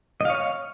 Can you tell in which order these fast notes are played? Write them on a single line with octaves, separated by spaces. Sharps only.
D#5 F5 C#5 F6